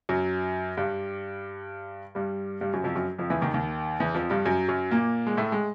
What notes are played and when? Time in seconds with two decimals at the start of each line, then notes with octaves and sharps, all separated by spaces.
0.09 F#2 F#3
0.77 G2 G3
2.15 G2 G3
2.61 G2 G3
2.73 F#2 F#3
2.84 F2 F3
2.95 F#2 F#3
3.19 F2 F3
3.30 E2 E3
3.41 D#2 D#3
3.54 D#2 D#3
4.00 E2 E3
4.15 F2 F3
4.30 G2 G3
4.45 F#2 F#3
4.68 F#2 F#3
4.91 A#2 A#3
5.27 G#3
5.37 A2 A3
5.52 G#3